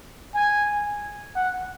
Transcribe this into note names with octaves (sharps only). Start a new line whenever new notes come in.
G#5
F#5